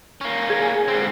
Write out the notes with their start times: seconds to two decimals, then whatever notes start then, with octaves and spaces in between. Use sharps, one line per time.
0.21 A#3 C#4
0.50 G#4 G#5
0.88 G#2 C4